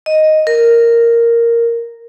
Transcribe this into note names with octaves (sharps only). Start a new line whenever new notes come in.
D#5
A#4